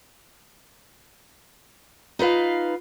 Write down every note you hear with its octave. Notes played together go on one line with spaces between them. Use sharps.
D#4 F4 B4 F5